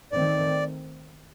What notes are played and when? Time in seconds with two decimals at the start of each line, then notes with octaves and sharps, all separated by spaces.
0.12 D#3 A3 C4 D5